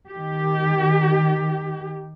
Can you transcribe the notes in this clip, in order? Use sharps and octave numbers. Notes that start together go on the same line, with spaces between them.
D#3 G4